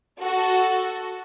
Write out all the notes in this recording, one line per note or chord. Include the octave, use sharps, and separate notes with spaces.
F#4 A4